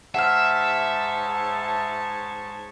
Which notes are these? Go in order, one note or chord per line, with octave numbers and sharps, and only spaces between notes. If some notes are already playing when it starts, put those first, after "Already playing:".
G#2 C#5 E5 F#5 A5 F6